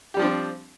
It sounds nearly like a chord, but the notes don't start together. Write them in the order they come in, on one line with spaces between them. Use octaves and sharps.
G4 G3 F3 D4 C4